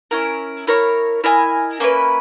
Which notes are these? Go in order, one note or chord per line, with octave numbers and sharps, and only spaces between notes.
C#4 E4 A#4
E4 A#4 C#5
E4 A#4 D#5 G#5
A#3 C#4 E4 B4